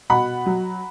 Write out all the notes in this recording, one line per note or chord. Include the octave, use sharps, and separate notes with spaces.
B2 F#5 B5
F#3